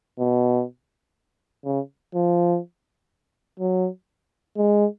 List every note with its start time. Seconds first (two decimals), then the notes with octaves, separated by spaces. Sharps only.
0.20 B2
1.65 C#3
2.15 F3
3.60 F#3
4.57 G#3